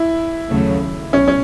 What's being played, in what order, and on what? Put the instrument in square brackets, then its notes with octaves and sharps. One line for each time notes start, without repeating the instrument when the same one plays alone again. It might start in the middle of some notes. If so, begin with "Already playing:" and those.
Already playing: [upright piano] E4
[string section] D#2 C#3 F#3 A3
[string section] B1 [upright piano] C#4
[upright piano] C#4